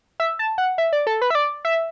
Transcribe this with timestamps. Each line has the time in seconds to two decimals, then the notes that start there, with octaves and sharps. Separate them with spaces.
0.20 E5
0.39 A5
0.58 F#5
0.78 E5
0.93 D5
1.07 A4
1.22 B4
1.30 E5
1.35 D5
1.65 E5